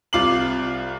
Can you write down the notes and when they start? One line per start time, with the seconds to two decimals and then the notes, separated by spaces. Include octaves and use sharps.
0.13 C2 F4 D6 C7 F#7